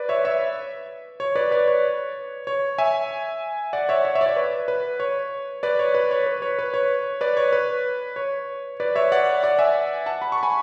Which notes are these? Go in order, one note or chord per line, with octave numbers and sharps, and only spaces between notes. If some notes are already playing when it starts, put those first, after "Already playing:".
Already playing: B4 D5
C#5 E5
C#5 E5
C#5
B4 D5
B4 D5
C#5
C#5
E5 G#5
D5 F#5
C#5 E5
C#5 E5
C#5 E5
D5
C#5
B4
B4
C#5
B4 D5
C#5
B4
C#5
B4
C#5
B4
C#5
B4 D5
C#5
B4
C#5
B4 D5
C#5 E5
D5 F#5
D5 F#5
E5 G#5
F#5 A5
B5
C#6
G#5 B5